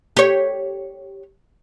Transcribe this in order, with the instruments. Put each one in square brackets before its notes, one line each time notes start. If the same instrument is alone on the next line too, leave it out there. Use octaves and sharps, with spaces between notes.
[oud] G4 C#5